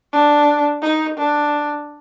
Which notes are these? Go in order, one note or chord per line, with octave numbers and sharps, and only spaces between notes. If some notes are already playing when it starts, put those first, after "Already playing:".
D4
D#4
D4